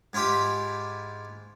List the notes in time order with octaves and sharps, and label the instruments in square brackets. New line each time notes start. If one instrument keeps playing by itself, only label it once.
[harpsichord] G#2 E4 F4 G4 B5